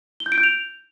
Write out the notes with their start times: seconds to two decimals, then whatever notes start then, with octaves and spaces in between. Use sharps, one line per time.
0.20 G7
0.26 G6
0.32 D7
0.38 G6
0.43 F7